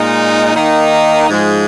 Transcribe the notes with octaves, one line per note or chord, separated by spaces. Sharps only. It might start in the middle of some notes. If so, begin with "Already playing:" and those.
Already playing: A#2 G#3 D#4
D#3 A#3 D#4
G#2 F3 G#3